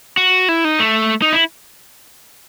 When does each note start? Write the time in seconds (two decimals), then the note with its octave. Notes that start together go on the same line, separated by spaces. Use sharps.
0.17 F#4
0.49 E4
0.64 D#4
0.80 A3
1.22 D#4
1.32 E4